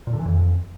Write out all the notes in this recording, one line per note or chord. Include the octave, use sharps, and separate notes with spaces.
A#2
D3
E3
F2